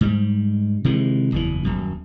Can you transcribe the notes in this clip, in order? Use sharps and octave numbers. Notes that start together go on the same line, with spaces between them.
G#2 G3
C3 D#3 E3 G#3
F#1 E2 E3
D#1 F#2